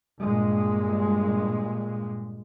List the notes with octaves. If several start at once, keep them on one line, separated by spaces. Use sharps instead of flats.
G2 A#2 G#3